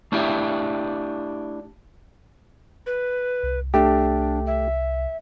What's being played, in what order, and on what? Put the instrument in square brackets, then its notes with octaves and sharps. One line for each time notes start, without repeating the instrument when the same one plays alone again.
[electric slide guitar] A3 D4 E4 G4 E5
[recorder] B4
[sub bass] C2
[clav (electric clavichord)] A3 G4 [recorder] D4
[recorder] E5